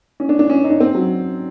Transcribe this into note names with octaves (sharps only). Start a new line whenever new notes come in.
C#4
D4
D4
C#4
D#4
D4
C4
F#3